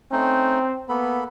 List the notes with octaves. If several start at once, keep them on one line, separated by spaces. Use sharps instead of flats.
A3 C4 C#4 D#4
A#3 B3 A4 B5